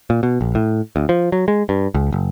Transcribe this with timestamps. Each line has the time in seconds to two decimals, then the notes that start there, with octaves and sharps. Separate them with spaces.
0.10 A#2
0.23 B2
0.41 A#1
0.55 A2
0.96 D2
1.09 F3
1.32 F#3
1.48 G#3
1.69 G2
1.94 C#2
2.12 F#1